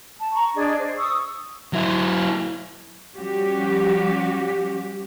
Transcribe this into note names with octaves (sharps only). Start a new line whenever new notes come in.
A5
A#5 C#6
D4 G#4 D#5
C5
C#6 D#6 E6
F#3 E4
F3 G3 C#4 F#4 G4